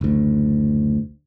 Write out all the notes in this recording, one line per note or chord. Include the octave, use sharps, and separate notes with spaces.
F#1 D2